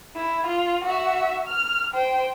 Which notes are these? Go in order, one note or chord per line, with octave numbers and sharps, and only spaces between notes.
E4
F4
F#4 E5
F6
C5 G5